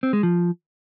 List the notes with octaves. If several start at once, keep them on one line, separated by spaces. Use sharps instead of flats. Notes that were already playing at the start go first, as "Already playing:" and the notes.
C4
G#3
F3